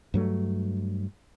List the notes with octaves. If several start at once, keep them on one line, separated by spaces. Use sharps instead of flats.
G2 F#3 A3